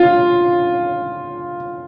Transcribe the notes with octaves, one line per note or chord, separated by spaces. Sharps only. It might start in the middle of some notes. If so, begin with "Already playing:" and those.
Already playing: F4